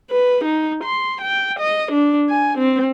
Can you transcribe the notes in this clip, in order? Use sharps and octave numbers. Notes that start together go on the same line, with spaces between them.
B4
D#4
C6
G5
D#5
D4
G#5
C4